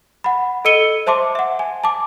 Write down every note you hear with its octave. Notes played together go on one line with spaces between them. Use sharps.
F#5 B5
A4 D#5 E6 C#7 D#7 G7
C5 E5 A5 C6 D6
E5 F#5
G#5
A5 D6